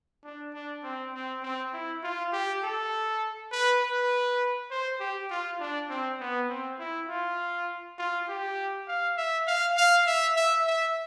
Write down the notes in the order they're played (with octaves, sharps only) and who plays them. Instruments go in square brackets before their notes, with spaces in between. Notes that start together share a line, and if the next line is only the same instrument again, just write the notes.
[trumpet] D4
D4
C4
C4
C4
E4
F4
G4
A4
B4
B4
C5
G4
F4
D4
C4
B3
C4
E4
F4
F4
G4
F5
E5
F5
F5
E5
E5
E5